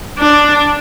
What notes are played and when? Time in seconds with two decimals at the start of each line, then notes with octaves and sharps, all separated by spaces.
0.19 D4